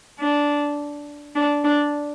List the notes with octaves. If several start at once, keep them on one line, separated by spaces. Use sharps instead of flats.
D4
D4
D4